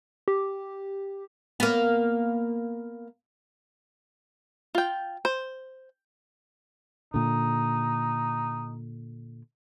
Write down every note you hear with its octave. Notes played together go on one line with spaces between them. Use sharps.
G4
A#3 B3
F4 G5
C5
A#2 D3 D#4